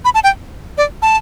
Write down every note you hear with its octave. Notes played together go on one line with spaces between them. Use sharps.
B5
A5
G5
D5
A5